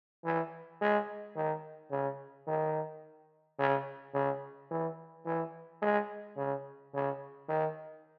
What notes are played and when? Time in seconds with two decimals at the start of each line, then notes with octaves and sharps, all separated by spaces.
0.24 E3
0.81 G#3
1.36 D#3
1.91 C#3
2.47 D#3
3.59 C#3
4.14 C#3
4.71 E3
5.26 E3
5.82 G#3
6.37 C#3
6.94 C#3
7.49 D#3